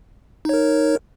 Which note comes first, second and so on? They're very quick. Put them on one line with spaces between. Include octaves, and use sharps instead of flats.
D#4 C#5 A#4